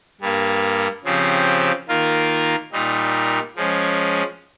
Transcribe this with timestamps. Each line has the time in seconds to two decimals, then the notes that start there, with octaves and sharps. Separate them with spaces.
0.21 G2 G3 A#3
1.04 C#3 F3 C4 G4
1.88 D#3 A#3 F4 A#4
2.72 A#2 G3 A#3 D#4
3.56 F3 G#3 C#4